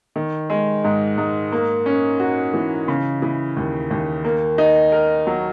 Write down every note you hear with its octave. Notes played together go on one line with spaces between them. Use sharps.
D#3
G#3
G#2
G#2
A#3
C#4
F#4
E3
C#3
E3
D#2
D#2
A#3
D#4
A#4
F#3